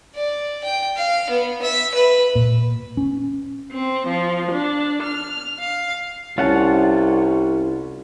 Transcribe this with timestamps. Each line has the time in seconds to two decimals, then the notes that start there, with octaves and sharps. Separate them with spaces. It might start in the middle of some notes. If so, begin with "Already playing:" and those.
0.15 D5
0.64 G5
0.96 F5
1.30 B3
1.62 E5
1.95 B4
2.35 A#2
2.97 C#4
3.71 C4
4.08 F3
4.52 D4
5.03 F6
5.58 F5
6.38 C2 C#4 F4 F#5 A5